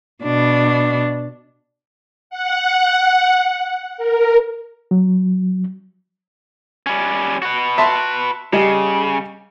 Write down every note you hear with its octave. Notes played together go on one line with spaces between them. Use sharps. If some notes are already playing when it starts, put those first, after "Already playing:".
B2 D4
F#5
A#4
F#3
G3 C#4
F#4 B4
E5 A5 C6
C#3 G3 D#5